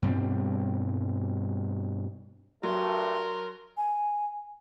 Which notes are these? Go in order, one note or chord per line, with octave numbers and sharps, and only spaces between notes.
G2 B2 G3 C4
G2 F#3 A3 A#4 C6
G#5